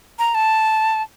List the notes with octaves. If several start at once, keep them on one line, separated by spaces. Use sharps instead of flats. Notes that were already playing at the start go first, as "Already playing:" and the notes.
A#5
A5